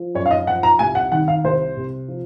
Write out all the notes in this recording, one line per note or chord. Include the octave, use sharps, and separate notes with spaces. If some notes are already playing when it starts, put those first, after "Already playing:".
Already playing: F3
F#2 C#5
F5
D#5
F3 F#5
A#5
C2 G#5
F#5
D#3 F#5
F5
C2 C5
C3
F3